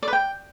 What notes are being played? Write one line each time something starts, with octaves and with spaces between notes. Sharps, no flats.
D5
B4
G5